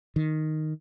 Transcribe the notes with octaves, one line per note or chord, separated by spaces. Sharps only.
D#3